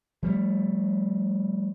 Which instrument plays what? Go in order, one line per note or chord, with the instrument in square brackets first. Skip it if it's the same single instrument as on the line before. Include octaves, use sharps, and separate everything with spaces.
[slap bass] F3 G3 A3